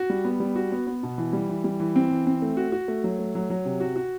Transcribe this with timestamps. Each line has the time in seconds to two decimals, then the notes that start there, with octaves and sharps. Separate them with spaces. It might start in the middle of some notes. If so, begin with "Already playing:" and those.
Already playing: F#4
0.10 G3
0.25 B3
0.40 G3
0.56 F#4
0.72 B3
0.87 B3
1.03 B2
1.18 E3
1.33 G3
1.49 E3
1.64 G3
1.80 E3
1.96 C4
2.11 E3
2.27 C4
2.42 A3
2.57 F#4
2.72 F#4
2.88 A3
3.04 F#3
3.19 A3
3.35 F#3
3.50 F#3
3.65 C3
3.80 F#4
3.96 F#4